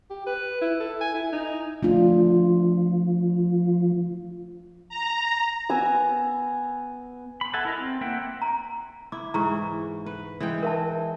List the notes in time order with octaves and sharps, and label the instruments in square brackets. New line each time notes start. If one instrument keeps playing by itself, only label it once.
[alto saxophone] G4
B4
E4
A4
G#5
E4
D#4
[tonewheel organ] F3 [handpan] A3 D4 F4
[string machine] A#5
[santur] B3 G#5 E6
[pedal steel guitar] B5
A4 E5 F#5 G#5 A5
E4 A#4 D#5
C4
A#3 E5 F#5 G5
[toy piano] A#5
[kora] E4 [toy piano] D6
[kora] G#2 E3 [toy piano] A#5 C#6
[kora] B4
E3 G#3 G5
[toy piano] A#4 E5 A5